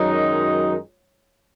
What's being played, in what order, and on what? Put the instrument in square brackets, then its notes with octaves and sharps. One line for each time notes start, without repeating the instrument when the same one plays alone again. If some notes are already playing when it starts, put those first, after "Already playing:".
Already playing: [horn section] F#2 D#3 G#3 D#4 [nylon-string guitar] F#3